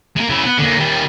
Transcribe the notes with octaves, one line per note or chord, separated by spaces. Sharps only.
G#3 A#3
C#3 E4
B3
D3 A#3
D#3 G3